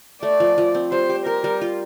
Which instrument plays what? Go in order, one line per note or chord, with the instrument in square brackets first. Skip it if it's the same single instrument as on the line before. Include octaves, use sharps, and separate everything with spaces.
[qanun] A3 [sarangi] D5
[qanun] F3
F3
C4
[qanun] G3 [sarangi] C5
[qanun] G4
[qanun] G4 [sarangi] A#4
[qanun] G3
F4